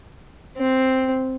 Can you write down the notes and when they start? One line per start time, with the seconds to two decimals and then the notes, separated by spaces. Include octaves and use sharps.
0.57 C4